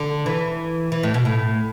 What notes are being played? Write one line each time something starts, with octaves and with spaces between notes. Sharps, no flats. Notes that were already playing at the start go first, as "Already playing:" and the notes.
Already playing: D3
E3
E3
A2
B2
A2